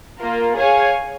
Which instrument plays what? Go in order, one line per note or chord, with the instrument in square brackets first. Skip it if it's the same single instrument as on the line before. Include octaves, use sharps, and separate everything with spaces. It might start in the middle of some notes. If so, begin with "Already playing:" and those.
[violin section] A#3 F4 A#4
G#4 C#5 F5 G#5